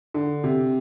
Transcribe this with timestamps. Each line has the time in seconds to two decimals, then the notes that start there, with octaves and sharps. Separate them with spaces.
0.14 D3
0.44 C3